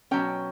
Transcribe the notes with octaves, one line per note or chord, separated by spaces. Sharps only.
B2 F#3 C#4 G5